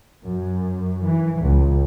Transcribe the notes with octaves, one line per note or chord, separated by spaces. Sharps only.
F#2
E3
C#2